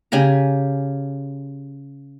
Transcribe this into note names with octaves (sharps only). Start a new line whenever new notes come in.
C#3 G4 G#5 A#5